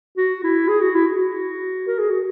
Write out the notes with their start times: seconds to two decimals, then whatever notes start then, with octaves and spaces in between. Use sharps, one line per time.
0.17 F#4
0.44 E4
0.68 G#4
0.81 F#4
0.95 E4
1.07 F#4
1.87 A#4
1.99 G#4
2.10 F#4